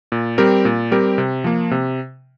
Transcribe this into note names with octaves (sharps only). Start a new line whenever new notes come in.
A#2
G3 C4 G4 A#4
A#2
G3 C4 G4 A#4
C3
F3 A#3
C3